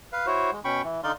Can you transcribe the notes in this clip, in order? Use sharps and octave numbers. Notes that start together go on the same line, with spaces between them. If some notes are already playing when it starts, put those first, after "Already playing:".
B4 F5
E4 F#4 C5 C#5
G#3
B2 C#4 G5 B5 C#6
E3
D3 D#4 D5 F5 C6